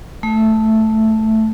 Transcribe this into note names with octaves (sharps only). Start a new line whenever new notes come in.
A3